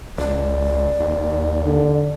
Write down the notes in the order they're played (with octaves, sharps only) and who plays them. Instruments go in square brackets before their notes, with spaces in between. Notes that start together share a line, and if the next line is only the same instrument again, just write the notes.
[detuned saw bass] C#2 [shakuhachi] D5
[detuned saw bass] D#2
[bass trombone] D3